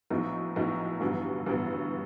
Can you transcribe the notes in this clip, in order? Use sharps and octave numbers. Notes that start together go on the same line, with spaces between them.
A#1 A2 F#3 B3 D#4
A#1 A2 F#3 B3 D#4
A1 G2 D3 F#3 B3
A1 G2 D3 F#3 B3